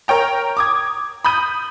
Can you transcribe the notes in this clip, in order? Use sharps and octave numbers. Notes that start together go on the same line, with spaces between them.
A#4 C#5 G5 A#5
D6 D#6 G#6
B5 D#6 G6 D#7